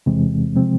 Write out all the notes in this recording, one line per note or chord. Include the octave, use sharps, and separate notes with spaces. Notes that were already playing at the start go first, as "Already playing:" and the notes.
E2 C3 E3 G#3 C4
C3 F3 G#3 C4